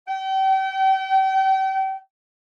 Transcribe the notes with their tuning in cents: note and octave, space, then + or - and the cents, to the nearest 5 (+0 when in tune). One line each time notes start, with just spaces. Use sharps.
G5 -35